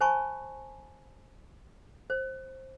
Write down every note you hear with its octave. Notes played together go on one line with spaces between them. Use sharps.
C5 G#5 A5 B5 C#6
C5